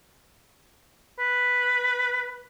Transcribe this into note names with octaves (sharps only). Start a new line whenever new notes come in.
B4